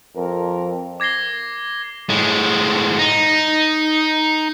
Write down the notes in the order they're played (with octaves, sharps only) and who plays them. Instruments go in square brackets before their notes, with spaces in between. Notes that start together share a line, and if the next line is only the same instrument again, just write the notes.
[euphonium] F2 [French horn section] A#4
[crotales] D6 G#6 A#6 C7 G7
[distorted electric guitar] A2 G#3
D#4